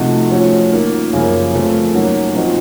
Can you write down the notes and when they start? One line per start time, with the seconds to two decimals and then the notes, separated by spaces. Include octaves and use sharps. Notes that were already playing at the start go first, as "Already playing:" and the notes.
Already playing: C3 F3 A3 D#4 F#4
0.30 F3 A3 C#4 F#4
0.72 D#3 A#3 F4
1.13 F#2 C#3 F3 A#3
1.54 C#3 F3 A3 C4
1.94 D#3 F#3 A#3 C#4 F#4
2.34 A#2 F3 C4 D#4 F#4